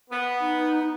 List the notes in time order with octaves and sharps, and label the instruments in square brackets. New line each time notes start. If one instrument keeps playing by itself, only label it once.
[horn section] B3
[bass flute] D#4